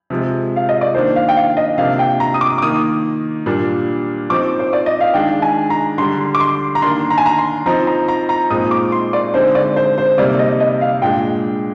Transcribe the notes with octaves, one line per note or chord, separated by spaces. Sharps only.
C3 F3 G#3
F5
D#5
D5
D#3 A#3 D4 C5
F5
G5
F5
D#5
C3 F3 A#3 D4 F5
G5
A#5
D#6
D6
D6
D#3 A#3 D#4 D#6
A#2 G3 A#3 D4
F3 C4 D#4 D6
C5
D5
D#5
F5
D#3 G#3 D4 G5
G#5
A#5
D3 G3 D4 C6
D6
C6
A#5
D#3 A#3 D4 C6
A#5
G#5
A#5
C6
F3 C4 D#4 A#5
A#5
A#5
A#5
A#2 G#3 C4 D#4 D#6
D6
C6
D5
D3 G#3 C4 D#4 C5
D5
C5
C5
C3 G3 A#3 D#4 D5
D#5
D#5
F5
A#2 G#3 D4 G5